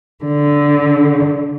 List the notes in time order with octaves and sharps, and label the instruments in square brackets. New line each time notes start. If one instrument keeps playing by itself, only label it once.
[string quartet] D3